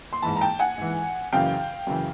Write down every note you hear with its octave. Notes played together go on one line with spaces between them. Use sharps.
C6
G#2 E3 A5 B5
A#5
G5 A5
F#5 G#5
G#2 E3
F#2 C#3 E3 F5 G5
F#2 C#3 E3